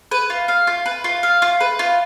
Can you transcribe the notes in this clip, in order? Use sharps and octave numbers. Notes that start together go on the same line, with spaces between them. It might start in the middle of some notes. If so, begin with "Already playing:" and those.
B4
F4
F5
F4
B4
F4
F5
F4
B4
F4